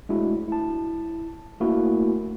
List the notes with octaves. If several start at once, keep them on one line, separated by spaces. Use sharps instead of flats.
G#3 A3 D4 E4 F#4
E4 A5
A3 A#3 D4 E4 F#4 A#4